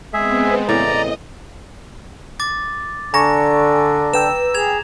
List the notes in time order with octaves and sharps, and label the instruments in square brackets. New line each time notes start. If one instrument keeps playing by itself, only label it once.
[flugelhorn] G#3 [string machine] B3 C4 [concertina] G#4 E5
[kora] A2 C#3 E3 [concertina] D5 A#5 [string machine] D#5
[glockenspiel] D6 A6
[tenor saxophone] D3 [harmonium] D4 [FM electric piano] G#5 C#6 [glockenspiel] A#5 A#6
[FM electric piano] B4 G5 E6 [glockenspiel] E7
[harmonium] G#4 [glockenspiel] G#6 F7